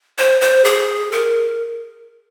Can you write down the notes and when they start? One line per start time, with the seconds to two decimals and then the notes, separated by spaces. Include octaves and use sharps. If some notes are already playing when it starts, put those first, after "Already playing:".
0.18 C5
0.41 C5
0.64 G#4
1.12 A#4